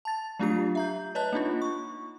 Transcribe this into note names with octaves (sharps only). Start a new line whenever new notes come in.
A5 A6
F#3 A3 D4 F4 G4 C7
E5 A#5 G6
B4 C#5 D#5 A5 F#6
A#3 D4 D#4 F4
C#6